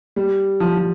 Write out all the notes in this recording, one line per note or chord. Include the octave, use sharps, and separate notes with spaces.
G3
F3
F3